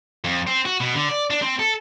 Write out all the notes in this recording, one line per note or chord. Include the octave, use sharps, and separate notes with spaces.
F2
C4
F#4
B2
D3
D5
D4
C4
A4